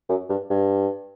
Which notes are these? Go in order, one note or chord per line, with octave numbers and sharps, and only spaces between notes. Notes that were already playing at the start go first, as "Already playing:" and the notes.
F#2
G2
G2